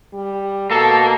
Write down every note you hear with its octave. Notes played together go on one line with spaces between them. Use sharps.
G3
B2 A#3 A4